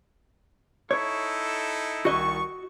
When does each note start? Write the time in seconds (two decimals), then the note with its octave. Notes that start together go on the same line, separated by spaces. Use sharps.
0.91 D#4 E4 A4 C#5
2.05 C2 D#3 F#4 D#5 C#6